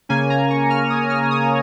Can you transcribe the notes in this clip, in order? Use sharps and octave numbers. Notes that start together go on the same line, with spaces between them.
C#3 A#3 C#4 G#5
A#5
C#6
F6
D#6
F6
D#6